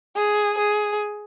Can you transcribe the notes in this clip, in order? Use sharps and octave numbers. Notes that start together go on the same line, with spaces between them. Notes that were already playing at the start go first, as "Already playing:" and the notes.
G#4
G#4